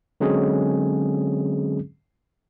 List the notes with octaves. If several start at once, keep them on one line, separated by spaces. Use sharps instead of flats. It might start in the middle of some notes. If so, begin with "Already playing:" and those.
D3 F#3 G#3 C4 C#4 G#4